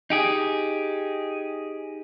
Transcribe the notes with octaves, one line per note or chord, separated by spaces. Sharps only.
D#4 G4 G#4